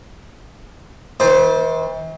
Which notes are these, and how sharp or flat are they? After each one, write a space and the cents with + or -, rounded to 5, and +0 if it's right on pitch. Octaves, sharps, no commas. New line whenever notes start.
E3 -45 C5 +0